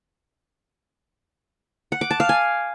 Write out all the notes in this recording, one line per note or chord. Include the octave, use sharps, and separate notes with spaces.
F#5
D6
A5
F5
G#5